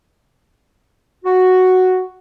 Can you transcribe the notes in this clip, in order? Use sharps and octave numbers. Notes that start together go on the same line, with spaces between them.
F#4